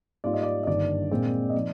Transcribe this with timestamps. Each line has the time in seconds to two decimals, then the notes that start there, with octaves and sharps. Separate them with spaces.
0.24 G#2 G3 A#3 F4 D5
0.34 D#5
0.43 D5
0.63 D#5
0.67 G1 G2 D#3 A#3 D4 D5
1.11 A#2 G#3 C4
1.50 D#5
1.54 F3 A#3 D#4 D5